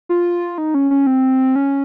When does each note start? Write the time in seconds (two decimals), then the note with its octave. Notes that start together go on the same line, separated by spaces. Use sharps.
0.09 F4
0.58 D#4
0.74 C#4
0.91 C#4
1.07 C4
1.56 C#4